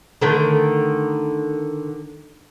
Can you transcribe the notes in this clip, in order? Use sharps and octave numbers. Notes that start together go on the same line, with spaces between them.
D3 D#3 A3